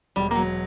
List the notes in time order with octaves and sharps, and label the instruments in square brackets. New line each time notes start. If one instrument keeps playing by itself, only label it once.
[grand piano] E1 [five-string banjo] G3
[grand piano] F#3 [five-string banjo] A#3